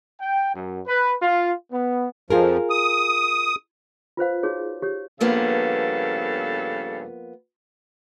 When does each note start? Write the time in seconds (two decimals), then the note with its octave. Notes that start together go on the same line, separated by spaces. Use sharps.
0.21 G5
0.55 F#2
0.87 B4
1.22 F4
1.71 B3
2.30 F2 F3 F4 G#4 A#4
2.70 D#6
4.17 F4 B4 C5 F5
4.43 D#4 F#4 G#4 C#5
4.82 G4 C#5
5.21 G2 C#3 F3 A#3 B3 A4